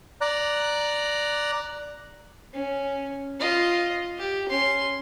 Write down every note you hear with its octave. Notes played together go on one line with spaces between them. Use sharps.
D5 A#5 F#6
C#4
F4 D#5
G4
C#4 C6